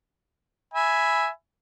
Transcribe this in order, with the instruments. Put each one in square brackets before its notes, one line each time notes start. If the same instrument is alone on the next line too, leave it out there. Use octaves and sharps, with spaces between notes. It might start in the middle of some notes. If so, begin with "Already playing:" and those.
[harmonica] E5 G#5 B5